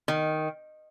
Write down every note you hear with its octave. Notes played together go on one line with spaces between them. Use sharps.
D#3